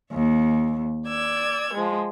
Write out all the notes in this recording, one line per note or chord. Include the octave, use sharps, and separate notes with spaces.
D#2
D5 E6 G#6
F3 G#3